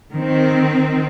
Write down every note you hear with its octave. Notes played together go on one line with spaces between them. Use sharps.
D#3 C4